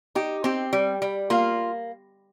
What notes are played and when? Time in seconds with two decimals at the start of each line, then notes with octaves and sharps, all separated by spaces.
0.15 D#4 G4
0.44 C4 G4
0.73 G3
1.02 G3
1.30 A#3 F4